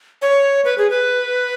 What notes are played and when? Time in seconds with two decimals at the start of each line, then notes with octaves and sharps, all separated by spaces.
0.22 C#5
0.65 B4
0.78 G#4
0.90 B4